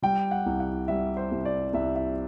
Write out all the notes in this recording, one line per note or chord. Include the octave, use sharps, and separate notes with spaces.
G3 G5
F#5
C2
F#5
G3 E5
C5
C2
D5
C2 E5
E5